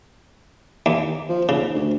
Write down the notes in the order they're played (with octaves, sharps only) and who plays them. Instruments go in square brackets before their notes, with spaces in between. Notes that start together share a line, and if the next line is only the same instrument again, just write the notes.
[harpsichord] D#2
[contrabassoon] F3
[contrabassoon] D#2 [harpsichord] C#3
[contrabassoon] D2